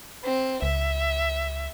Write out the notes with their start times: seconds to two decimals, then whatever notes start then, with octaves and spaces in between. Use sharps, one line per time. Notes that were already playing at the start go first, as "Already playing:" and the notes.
0.24 C4
0.62 C#2 E5